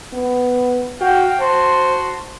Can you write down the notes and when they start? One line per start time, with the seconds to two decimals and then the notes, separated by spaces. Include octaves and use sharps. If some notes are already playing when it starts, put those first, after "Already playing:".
0.13 B3
1.01 F#4 F5 G5
1.40 F#4 C5 A5 C6